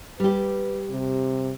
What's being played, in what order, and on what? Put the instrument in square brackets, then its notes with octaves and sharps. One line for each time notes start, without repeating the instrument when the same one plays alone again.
[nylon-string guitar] G3 G4 [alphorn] B4
[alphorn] C3